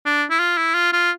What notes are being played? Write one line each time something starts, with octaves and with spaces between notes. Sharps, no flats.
D4
E4
F4
E4
F4
F4